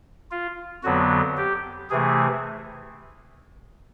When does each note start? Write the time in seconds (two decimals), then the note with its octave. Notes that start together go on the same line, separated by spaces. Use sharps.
0.31 F4
0.83 F2 D3 F#3 B3 F#4
1.37 G4
1.90 C3 E3 A3 G#4